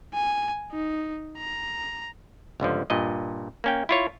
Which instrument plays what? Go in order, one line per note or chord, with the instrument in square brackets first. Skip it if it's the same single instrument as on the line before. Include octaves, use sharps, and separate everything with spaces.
[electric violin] G#5
D#4
A#5
[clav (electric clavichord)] G1 C#2 D3 F3
G2 A#2 D#5
A#3 C#4 G5
E4 F4 C#5